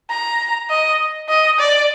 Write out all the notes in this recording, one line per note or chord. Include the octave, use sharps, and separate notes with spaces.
A#5
D#5
D#5
D5